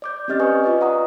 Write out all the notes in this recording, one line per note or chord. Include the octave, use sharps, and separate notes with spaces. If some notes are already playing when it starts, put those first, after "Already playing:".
D5 D6 G6
C4 C#4 G4 D#5 F6 A6
B4 G#5 C#6 D#6
F4 B4 D5 D#5
F#5 A#5 C#6 D#6